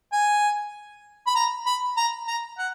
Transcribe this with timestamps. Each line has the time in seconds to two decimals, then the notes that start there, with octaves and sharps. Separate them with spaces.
0.13 G#5
1.27 B5
1.35 A#5
1.66 B5
1.97 A#5
2.27 A#5
2.58 F#5